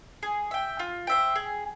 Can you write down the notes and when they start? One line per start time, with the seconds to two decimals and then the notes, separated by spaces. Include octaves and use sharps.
0.23 G#4
0.51 E5 G5
0.79 F4
1.07 C5 E5 G5
1.35 G#4